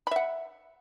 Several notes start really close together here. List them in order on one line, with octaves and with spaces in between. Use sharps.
B5 E5 F#5